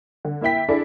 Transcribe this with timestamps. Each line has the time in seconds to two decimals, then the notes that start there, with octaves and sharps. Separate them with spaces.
0.25 D3
0.41 A#3 E4 E5 G5 B6
0.69 D4 E4 G#4 A4